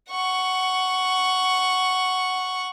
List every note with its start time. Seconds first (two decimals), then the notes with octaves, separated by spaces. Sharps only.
0.10 F#5 C#6